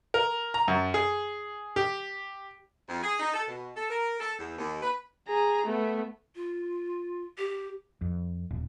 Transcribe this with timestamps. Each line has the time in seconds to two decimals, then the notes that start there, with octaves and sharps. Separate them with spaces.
0.14 A#4
0.54 A#5
0.68 F#2
0.94 G#4
1.76 G4
2.88 F2
3.03 G#4
3.20 D#4
3.34 A4
3.47 B2
3.75 A4
3.89 A#4
4.20 A4
4.38 E2
4.58 D#2
4.81 B4
5.28 G#4 A#5
5.66 A3 B3
6.36 F4
7.38 G4
8.01 F2
8.51 D#1